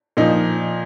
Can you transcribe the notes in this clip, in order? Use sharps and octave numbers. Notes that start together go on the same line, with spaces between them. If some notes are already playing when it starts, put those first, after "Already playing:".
A#2 F3 D#4